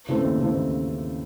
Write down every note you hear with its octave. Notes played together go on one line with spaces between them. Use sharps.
C#3 E3 A3 C4
D#2
C#3 E3 A3 C4
D#2